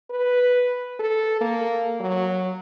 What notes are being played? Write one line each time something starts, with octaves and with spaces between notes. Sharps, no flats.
B4
A4
A#3
F#3